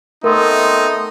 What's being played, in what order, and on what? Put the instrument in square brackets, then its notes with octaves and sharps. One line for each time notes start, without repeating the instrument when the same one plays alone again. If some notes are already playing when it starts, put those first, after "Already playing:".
[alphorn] A3 [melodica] B3 C4 [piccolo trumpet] D#4 [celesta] A#4